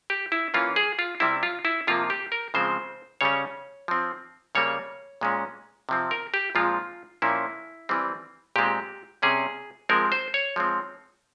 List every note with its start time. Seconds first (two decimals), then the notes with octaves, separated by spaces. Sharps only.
0.10 G4
0.32 E4
0.54 E3 A#3 C#4 F4
0.76 G#4
0.99 F4
1.20 C3 G3 C4 E4
1.43 F4
1.65 E4
1.87 C3 F3 A#3 F4
2.10 G4
2.32 A#4
2.54 C#3 F3 G#3 C4 C5
3.21 C#3 G3 C#4 C#5
3.88 F3 C4
4.55 C#3 G3 A#3 C#5
5.21 A#2 G#3 C#4
5.89 C3 F3 C4
6.11 A#4
6.34 G4
6.55 A#2 F3 G#3 C4 F4
7.22 A#2 F3 A#3 C#4 E4
7.89 E3 G3 C4
8.56 A#2 G#3 C4 G4
9.22 C3 G3 C#4 G#4
9.89 F3 G#3 C4 A#4
10.12 C5
10.34 C#5
10.56 F3 G#3 C4